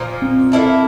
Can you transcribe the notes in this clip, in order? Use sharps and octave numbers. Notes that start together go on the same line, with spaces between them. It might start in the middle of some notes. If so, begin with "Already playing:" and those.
Already playing: A#2 F3 A#3 D#4
C4
A#3 C#4 E4 A4